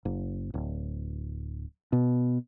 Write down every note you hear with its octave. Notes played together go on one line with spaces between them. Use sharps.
F#1
D1
B2